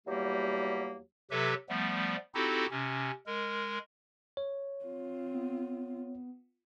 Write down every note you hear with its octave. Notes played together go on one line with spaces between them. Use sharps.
E2 F#3 G3 A#3 G4
C3 F#3 G4 A4 B4 E5
F3 G3 A3 B3
C4 D#4 E4 F#4 G4 A4
C3 C#4
G#3 A#4
C#5
C4 F4
B3